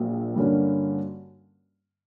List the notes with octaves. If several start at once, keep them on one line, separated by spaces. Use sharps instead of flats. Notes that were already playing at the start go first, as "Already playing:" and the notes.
Already playing: A#1 A#2 F#3 A#3
G2 D3 A#3 C#4 F#4